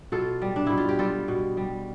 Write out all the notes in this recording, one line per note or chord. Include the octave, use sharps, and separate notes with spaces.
B2 F4 A4
G3
D4
B2 E4
F4
G4
G3 F4 A4
B2
G3